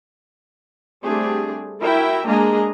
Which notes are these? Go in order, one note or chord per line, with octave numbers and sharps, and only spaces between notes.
G3 A3 C4 D4 G4 G#4
E4 F#4 A#4 E5 G5
G#3 A#3 D4 G#4 D#5 A#5